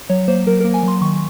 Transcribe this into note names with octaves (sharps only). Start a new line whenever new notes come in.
F#3 C#5
A#3 C5
F#3 A#4
A#4
A#3
G#5
F#3 C6
D#3 C#6